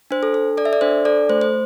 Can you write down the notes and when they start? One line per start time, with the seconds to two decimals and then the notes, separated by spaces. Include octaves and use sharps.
0.11 D4 C5
0.23 A4
0.34 A4
0.57 A4 D5
0.65 E5
0.73 D5
0.81 D4 C5
1.05 A4 D5
1.29 A3 C5
1.41 C5